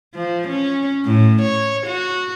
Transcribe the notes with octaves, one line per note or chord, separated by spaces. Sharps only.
F3
C#4
A2
C#5
F#4